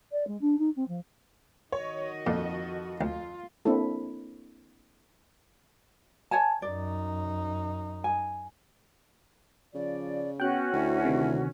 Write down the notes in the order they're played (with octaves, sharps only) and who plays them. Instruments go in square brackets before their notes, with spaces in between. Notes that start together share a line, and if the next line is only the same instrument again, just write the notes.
[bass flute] D5
G#3
D4
D#4
C4
F3
[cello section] D#3 F#4 D#5 [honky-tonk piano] C#5
[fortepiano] F2 [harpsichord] A#2 [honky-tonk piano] A4
[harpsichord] D2 [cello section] F4
[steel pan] A#3 C4 D4 E4 A4
[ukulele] C#5 G#5 A5
[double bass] F#2 D#4 [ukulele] D5
[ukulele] G#5
[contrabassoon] C#3 [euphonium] F3 [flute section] D5
[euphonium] B3 [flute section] C#4 F#4 [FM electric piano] G5 F#6
[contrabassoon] D2 [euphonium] E4
[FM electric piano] C3 D#3